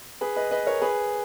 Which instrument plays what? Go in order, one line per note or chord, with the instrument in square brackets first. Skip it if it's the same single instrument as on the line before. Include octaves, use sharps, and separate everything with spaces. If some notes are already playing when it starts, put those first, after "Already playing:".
[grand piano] G#4 B4
B4 D#5
B4 D#5
A#4 C#5
G#4 B4